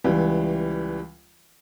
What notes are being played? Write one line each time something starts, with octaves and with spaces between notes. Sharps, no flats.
C#2 E3 G3